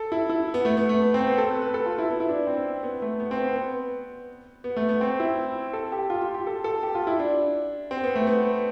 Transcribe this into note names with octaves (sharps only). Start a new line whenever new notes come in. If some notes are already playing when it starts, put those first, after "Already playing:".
Already playing: A4
E4
E4
B3
A3
B3
A3
B3
C4
B3
A4
B4
B4
A4
F4
E4
B3
E4
D4
C4
B3
A3
B3
C4
B3
B3
B3
A3
B3
C4
E4
A4
G4
F4
F4
G4
A4
A4
G4
F4
E4
D4
C4
B3
A3
B3